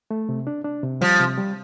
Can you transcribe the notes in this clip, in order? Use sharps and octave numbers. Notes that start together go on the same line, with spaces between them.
A3
C3
D4
D4
C3
F3 G3
C3
G3